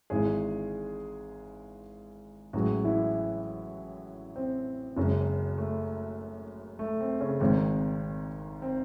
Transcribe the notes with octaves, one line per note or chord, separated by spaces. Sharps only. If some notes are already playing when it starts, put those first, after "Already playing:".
G#1 G#2 E3 G#3 G#4
A1 A2 F#3 G#3 F#4
E3 E4
C4
F#1 F#2 C#3 G#3
A3
A3
C4
C#3 C#4
G#1 G#2 D#3 C4
C4